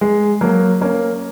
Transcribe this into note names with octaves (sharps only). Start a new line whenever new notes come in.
G#3
F#3 A#3
A#3 C#4